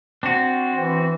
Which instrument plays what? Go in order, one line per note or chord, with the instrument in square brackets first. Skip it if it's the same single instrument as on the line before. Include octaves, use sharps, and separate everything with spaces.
[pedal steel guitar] C4 [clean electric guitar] D4 F#4
[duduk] E3